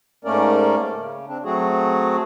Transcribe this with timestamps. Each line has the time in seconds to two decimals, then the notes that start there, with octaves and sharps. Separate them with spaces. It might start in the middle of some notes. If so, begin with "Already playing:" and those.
0.25 G#2 A3 A#3 C#4 A#4 D5
0.95 C#3
1.27 C4 D4
1.44 F#3 A3 C4 F#4 G#4